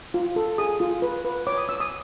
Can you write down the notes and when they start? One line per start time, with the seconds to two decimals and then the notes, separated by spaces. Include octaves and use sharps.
0.14 F4
0.36 A4
0.58 G#4 D#6
0.80 F4
1.02 B4
1.25 B4
1.47 C#5 D6
1.58 D#6
1.69 C#5 E6
1.80 D#6